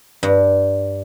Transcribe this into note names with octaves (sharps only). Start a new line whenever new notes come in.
G2